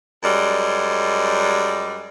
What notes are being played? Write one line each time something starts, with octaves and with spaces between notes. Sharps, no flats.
F#2 G3 G#3